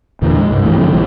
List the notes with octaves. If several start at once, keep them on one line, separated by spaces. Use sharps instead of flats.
E2 A#2 D3 E3
G#3
C2 G2
G#2 E3 A3
F#2 D3 F3 C4
B1 A#2 E3 G3